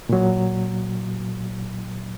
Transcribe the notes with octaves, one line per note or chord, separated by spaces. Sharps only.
A#2 F#3